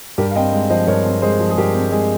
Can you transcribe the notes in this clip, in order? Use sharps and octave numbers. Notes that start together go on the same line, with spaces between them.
G2 G4 A#4
F5
C4 D#5 G5
G#3
F3 C5 D#5
G2 A#4 C#5
C4
G#3 G#4 C5
F3
G#4
G2 G4 A#4
C4
G#3 G#4